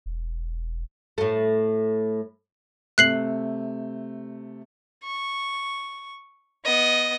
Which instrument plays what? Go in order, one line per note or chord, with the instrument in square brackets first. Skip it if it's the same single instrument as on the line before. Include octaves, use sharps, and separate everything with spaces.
[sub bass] E1
[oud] A2 A3
[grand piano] C3 A3 [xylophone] F#6 C7 F#7
[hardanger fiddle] C#6
B3 D#5